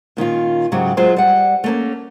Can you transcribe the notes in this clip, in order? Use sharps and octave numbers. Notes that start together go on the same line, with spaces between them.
A#2 D#3 C#4 F4
G#2 C#3 F#3 F#4 G4
F#3 G#3 F4 G#4 C5
G3 F#5
A3 A#3 C#4